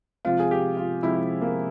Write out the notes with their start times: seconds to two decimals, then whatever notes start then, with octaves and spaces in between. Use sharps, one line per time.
0.25 C3 F3 G#3 C4 F4
0.39 G#4
0.51 G4
0.77 F4
1.03 C3 F3 G#3 C4 E4
1.41 A#3